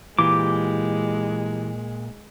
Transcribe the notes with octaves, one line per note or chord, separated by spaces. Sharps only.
A#2 E3 G#3 G4 D6